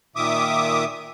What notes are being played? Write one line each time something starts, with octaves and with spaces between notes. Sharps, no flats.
A#2 D#3 E5 D6 D#6